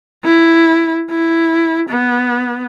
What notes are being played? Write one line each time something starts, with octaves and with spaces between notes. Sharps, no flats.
E4
E4
B3